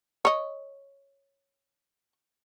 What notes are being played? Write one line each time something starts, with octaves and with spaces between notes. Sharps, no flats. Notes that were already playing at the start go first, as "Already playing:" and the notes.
C#5 D#5